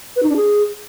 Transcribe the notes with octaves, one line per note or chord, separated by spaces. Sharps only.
B4
D#4
D4
G#4